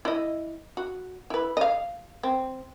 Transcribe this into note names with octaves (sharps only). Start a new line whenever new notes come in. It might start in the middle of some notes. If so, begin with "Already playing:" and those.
E4 D#5
F#4
E4 B4
D#5 F5
C4